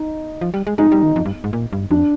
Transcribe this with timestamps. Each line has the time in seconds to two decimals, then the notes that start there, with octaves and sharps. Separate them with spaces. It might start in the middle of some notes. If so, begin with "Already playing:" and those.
Already playing: D#4
0.41 F3
0.54 G3
0.67 G#3
0.78 G#3 D#4
0.92 G3
1.03 D#3
1.16 F2
1.25 G2
1.44 G#2
1.53 A#2
1.73 G2
1.91 F2 D4